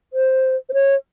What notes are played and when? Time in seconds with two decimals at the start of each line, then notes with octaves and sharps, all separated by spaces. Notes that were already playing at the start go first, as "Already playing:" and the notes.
0.13 C5
0.69 C5
0.74 C#5